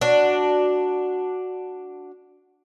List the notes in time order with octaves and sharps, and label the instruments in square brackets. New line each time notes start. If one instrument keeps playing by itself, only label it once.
[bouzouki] D4 F#4